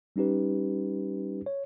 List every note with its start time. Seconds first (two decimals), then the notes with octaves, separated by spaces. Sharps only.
0.16 G3 C#4 D#4 G4 B4
1.46 C#5